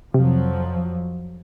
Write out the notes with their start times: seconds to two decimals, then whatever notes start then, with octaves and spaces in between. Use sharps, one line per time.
0.14 F2 C3 F3 F#3